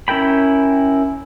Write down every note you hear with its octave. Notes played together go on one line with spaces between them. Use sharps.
C#4 E4 A#4 G5 B5